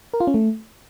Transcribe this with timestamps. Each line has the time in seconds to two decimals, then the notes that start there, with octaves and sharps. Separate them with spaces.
0.14 A#4
0.20 F4
0.27 C#4
0.34 A3